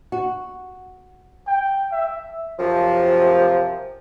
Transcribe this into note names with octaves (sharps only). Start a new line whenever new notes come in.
F#4
G5
E5
F#2 C3 F3